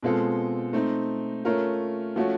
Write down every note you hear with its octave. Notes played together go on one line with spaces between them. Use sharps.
B2 G#3 C4 F4 A4
A3 C4 D#4
A3 C#4 F4 A#4
F3 A3 C#4 F#4